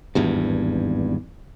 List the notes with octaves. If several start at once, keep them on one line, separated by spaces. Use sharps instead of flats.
G#1 E2 G2